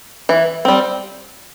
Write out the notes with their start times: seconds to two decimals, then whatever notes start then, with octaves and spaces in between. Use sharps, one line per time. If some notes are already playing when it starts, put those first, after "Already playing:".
0.29 E3
0.65 G3 C4